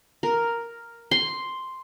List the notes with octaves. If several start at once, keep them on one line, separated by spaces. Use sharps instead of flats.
A#4
C6